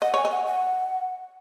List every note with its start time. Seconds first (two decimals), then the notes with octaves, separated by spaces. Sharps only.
0.02 D#5 F#5
0.14 C#5 G#5
0.25 D#5
0.31 F#5
0.46 F#5